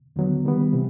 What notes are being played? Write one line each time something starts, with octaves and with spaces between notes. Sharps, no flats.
D#2 D3 F#3 B3
D#3 G3 B3
C3 E3